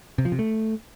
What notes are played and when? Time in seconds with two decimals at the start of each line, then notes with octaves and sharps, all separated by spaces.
0.18 C3
0.25 F3
0.32 C3
0.39 A3